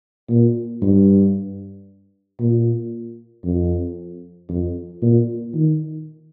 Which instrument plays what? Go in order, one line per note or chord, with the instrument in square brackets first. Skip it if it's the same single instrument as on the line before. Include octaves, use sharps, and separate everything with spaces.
[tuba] A#2
G2
A#2
F2
F2
A#2
D#3